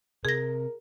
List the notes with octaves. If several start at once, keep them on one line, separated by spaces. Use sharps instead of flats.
C3 G#4 A#4 A#6